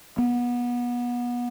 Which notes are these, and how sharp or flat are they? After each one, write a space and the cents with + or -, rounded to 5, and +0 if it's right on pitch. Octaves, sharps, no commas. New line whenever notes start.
B3 -25